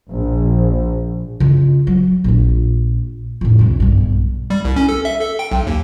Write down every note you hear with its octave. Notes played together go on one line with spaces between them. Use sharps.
A#1
C#3 F4
F#3
A#1 F4
F2 A2
C2 D3
B1 G2
G3
C2
C#4
A4
E5
A4
G5
B1
D#2